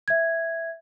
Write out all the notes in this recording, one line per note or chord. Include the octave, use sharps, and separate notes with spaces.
E5 G#6